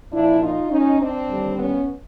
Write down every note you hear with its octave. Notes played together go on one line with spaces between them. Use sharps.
A#2 F3 D4 E4
D#4 F4
C#4 D#4
C4 D4
D#2 D3 G3
B3 C#4